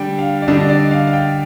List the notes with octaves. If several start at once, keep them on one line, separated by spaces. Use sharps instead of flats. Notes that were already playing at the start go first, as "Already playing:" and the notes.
Already playing: D3 G3 D4 G5
F5
D5
D3 G3 D4 D#5
D#5
D5
F5
F5
G5